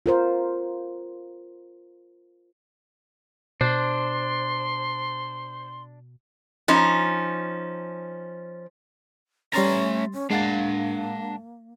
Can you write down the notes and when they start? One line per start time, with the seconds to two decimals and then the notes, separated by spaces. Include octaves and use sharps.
0.06 F4 A#4 C5
3.61 B2 D4 C5 C6
6.68 F3 C#4 D#4
9.53 G3 A3 C#4 A#5 C6 A6
10.13 C#4
10.31 G#3 A#3 D4 F5 F#5 A6